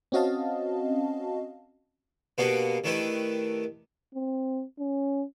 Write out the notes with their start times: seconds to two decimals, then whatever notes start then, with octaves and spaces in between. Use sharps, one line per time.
0.12 C4 C#4 F#4 D#5 F5 A5
2.38 B2 A#3 B3 D4 F#4 G4
2.84 D#3 A3 D4 E4 G4 B4
4.14 C4
4.79 C#4